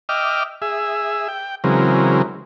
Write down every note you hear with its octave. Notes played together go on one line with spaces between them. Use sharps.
D#5 E5 G5 D6 F6
G#4 E5
G5
C#3 E3 F#3 G#3 C4 A#4